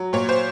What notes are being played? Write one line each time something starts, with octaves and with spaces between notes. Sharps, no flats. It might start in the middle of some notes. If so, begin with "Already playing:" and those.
Already playing: F#3
A#2 C#5
C5